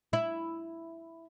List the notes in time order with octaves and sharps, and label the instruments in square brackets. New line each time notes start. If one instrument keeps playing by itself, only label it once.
[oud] E4